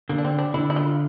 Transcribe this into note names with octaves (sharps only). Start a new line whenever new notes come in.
D3 A#3
D4
C4
D4
D3 E4
E4
F4